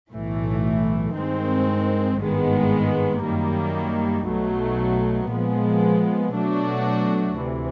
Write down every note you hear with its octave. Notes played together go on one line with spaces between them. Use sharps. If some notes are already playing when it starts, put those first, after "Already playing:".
B1 A2 E3 A3
G2 D#3 G#3 C4
G#1 G2 D#3 G#3 B3
F#2 D#3 G3 A#3
B1 B2 F#3 A3
A#2 F3 G#3 B3
B2 F#3 A3 D4 F#4
D2 C3 E3